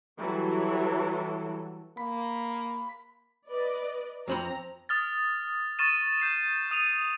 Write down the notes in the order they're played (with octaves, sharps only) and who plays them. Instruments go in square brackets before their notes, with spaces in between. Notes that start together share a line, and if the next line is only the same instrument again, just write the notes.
[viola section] E3 F#3 G3 A4
[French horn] A#3 [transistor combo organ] B5
[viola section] B4 D5 D#5
[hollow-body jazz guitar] F2 C4 B5 [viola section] A#5
[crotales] D#6 F6 A6
C#6 F6 A6 D#7 E7
G6 C7 E7
D#6 D#7 F7